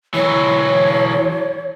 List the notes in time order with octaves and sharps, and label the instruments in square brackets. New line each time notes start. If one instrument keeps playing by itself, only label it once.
[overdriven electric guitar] E3 F#3 [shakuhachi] C#5